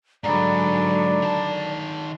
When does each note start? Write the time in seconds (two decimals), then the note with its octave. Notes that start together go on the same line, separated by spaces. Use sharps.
0.24 G#2 D3 F#3 D5 A#5 B5
1.22 D#3 A5